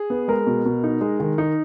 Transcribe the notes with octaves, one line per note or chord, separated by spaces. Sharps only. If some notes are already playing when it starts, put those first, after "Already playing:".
Already playing: G#4
B3
G#3 A#4
B2
B2
D#4
G#3
D#3
D#4